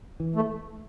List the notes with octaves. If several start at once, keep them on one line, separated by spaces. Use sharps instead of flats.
E3
A3